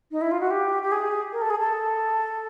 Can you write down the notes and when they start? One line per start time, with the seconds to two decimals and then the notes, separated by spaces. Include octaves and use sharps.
0.11 D#4
0.21 E4
0.31 F4
0.40 F#4
0.51 G4
0.82 G4
0.92 G#4
1.32 A#4
1.41 A4
1.50 G#4
1.59 A4